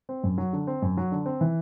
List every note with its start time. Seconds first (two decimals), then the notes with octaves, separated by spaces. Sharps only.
0.09 C4
0.24 F#2
0.38 F#3
0.53 D3
0.67 C4
0.82 F#2
0.97 F#3
1.12 D3
1.26 C4
1.41 E3